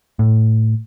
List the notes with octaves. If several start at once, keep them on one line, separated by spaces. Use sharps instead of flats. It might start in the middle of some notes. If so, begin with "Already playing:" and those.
A2